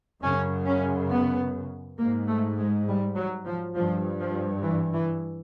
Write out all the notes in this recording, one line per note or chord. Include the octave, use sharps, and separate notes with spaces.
F#2 C#3 C#4
C#4
B3
G#2 A#3
A3
G#3
G3
F#3
F3
G2 F3
F3
E3
E3